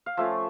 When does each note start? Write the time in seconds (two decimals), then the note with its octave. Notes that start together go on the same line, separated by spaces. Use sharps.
0.06 F5
0.17 F3 A3 C#4 E5